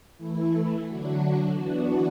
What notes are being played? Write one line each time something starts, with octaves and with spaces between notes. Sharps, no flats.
E3 A3 E4
D3 F#3 D4 F#4
E3 B3 D4 F#4